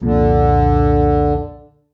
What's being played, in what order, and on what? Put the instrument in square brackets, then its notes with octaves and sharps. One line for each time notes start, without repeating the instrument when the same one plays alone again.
[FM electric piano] C2 F2 A#2 [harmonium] D3